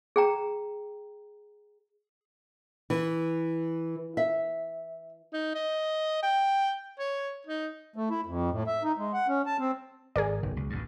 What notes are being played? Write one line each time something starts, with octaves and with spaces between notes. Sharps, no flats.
G#4 G5 A#5
E3
E5
D#4
D#5
G5
C#5
D#4
A3
E4
F2
A2
E5
D#4
G#3
F#5
C#4
A5
C4
G#1 G#4 A#4 D5
F#1 B1
C#2
A1 D2 G2